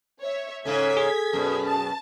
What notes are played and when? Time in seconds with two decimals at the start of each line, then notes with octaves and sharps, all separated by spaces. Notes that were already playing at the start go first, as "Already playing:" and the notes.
0.21 C#5 E5
0.65 G#2 C#3 C#4 A4 G#6 B6
0.97 G#4
1.33 F#2 B2
1.64 A5